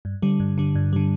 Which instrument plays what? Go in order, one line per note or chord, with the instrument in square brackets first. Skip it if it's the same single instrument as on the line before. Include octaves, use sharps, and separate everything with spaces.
[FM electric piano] G2
D3 G3
G2
D3 G3
G2
D3 G3